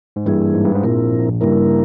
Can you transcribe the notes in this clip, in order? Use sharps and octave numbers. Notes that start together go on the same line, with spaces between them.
G#2
G2 E3 G3 A#3 E4 G#4
G#2
G2
G#2
A#1 A#2 F3 C4 E4 A#4
G2 C#3 G3 A#3 E4 A#4